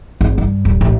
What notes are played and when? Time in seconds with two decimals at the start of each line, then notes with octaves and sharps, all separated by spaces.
0.21 G#1
0.38 G2
0.65 D#1
0.81 A1